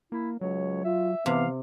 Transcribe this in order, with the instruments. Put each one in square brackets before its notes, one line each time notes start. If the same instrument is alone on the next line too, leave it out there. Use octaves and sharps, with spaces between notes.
[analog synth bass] A#3 [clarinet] E4
[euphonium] C#2 [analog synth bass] F#3 [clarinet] C#5
[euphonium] F4 [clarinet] E5
[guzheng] C3 [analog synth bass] E3 [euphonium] B3 [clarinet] F5